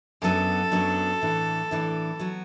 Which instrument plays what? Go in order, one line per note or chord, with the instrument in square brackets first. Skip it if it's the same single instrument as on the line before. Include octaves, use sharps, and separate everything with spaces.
[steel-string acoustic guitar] F#2 F#3 B3 D4 [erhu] A4
[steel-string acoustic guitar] F#2 F#3 B3 D4
A2 E3 D4
A2 E3 D4
F#3 B3 F#4